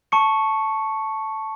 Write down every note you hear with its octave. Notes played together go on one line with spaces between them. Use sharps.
A5 C#6 C#7